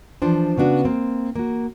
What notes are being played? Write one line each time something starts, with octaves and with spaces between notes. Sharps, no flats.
E3 F3 D4 C5
C#3 B3 D4 F#4
A#3 C4
A#3 F#4